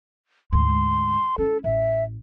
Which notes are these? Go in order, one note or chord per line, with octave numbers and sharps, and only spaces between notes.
D2 G#2 C6
C#4 E4 A4
A1 E5